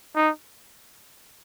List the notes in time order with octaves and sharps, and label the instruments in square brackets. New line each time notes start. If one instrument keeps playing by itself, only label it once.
[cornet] D#4